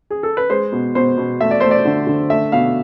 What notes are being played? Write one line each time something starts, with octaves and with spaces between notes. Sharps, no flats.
G#4
A4
B4
G#3 C5
B2
B2 C5
B2
A3 E5
D5
A3 C5
D5
D3
D3
A3 E5
B2 F5